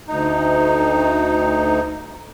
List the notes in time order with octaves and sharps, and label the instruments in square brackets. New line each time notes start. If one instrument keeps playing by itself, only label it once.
[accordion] D2 D#4